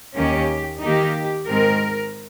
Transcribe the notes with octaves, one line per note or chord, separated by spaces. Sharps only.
D#2 D#3 A#3 C#4 G4
D#3 A#3 D#4 G4
G#2 D#3 G#3 C4 A#4